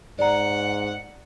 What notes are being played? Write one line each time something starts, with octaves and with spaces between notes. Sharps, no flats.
G#2 D5 F#5 A#5